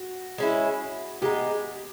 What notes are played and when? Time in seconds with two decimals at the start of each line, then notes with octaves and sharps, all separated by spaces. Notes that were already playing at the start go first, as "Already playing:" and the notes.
Already playing: F#4
0.38 G#3 C#4 E4
1.22 G#3 B3 D#4 G4